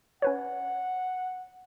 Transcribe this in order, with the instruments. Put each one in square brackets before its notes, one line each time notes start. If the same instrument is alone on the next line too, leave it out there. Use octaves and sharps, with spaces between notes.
[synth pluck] C#4 B4 C#5 [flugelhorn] F#5